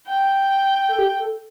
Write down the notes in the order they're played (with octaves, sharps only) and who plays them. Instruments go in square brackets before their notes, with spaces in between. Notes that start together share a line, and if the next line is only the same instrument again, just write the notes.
[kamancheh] G5
[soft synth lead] A4
G4
A4